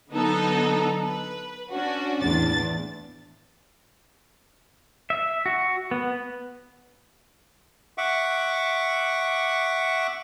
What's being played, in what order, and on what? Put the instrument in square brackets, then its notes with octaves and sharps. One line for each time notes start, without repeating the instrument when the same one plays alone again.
[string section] D3 F#3 B3 D#4 A4
B4
C#4 D4 F#4
E2 A2 D4 A6
[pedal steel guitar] E5
F#4
B3
[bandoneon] E5 F#5 C#6 D6